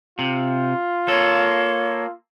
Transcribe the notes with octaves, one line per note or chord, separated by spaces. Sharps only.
C3 F4
A#3 A4 C#5